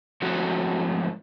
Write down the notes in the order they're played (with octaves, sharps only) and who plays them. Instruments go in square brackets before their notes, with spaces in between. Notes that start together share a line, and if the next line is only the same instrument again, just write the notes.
[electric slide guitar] G#2 F3 F#3 A3 C4 F#4